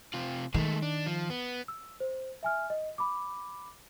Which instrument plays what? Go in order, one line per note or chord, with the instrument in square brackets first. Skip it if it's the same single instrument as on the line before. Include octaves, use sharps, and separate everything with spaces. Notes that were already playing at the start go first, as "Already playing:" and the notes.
[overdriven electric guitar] C3 F4
[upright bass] D#3 [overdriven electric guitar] G#3 A3
[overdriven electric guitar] D4
F3
B3
[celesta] E6
C5
E5 G#5 F6
D#5
B5 D6